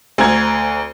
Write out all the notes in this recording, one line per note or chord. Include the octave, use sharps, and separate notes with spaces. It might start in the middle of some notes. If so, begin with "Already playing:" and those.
D2 C4 A#5 G#6